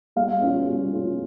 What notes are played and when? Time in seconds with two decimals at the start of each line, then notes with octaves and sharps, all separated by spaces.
0.16 G3 F5
0.41 C#4 F4
0.67 G3
0.92 C#4 F4